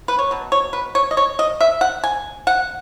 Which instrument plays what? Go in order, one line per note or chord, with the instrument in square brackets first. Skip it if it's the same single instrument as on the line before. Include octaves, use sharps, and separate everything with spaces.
[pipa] B4
C#5
B2 F#3
C#5
B4
C#5
D#5
C#5
D#5
E5
F#5
G#5
F#5